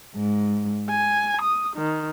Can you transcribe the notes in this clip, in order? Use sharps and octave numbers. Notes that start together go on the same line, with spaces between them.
G#2
G#5
D#6
D#3